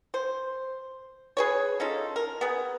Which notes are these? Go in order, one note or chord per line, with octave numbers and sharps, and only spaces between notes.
C5
G#4 B4 C#5
C#4 D#4 F4 A4
A#4
B3 G#4